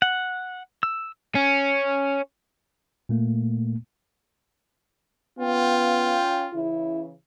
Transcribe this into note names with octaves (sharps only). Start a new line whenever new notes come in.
F#5
E6
C#4
A#2 A3 A#3
B3 C#4 F4 F5 G5
C#3 E3 E4